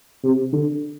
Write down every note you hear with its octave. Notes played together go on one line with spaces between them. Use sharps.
C3
D3